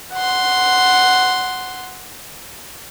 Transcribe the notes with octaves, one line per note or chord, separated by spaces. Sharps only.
F#5 C6